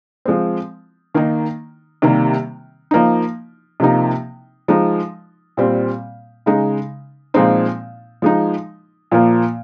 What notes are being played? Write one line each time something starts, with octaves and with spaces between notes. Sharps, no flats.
F3 G#3 C4
D#3 A#3 D#4
C3 D#3 G3 A#3
F3 A#3 D#4
C3 F3 A#3 D#4
F3 G#3 D#4
A#2 G3 C4
C#3 G#3 D#4
A#2 F3 G#3 C4 D#4
F3 G#3 D#4
A#2 F3 A#3